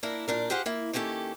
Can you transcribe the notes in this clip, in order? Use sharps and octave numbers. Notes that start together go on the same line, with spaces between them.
A#3 D4 E4 A#4
A#2 D4 A#4
G4 G#4 C5 F5 F#5
A#3 E4
D#3 A#3 C#4 G4 A4